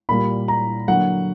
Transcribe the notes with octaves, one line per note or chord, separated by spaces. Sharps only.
A#2 G3 A#3 B5
A#5
D3 F#3 A#3 F#5